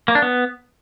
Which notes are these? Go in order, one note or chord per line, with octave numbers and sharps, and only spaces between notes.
A#3
D4
B3